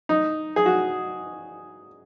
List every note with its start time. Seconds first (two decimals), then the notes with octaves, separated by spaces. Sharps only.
0.09 D#4
0.56 G#4
0.66 F#4